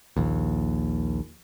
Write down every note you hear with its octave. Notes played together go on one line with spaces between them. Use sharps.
A#1 D#2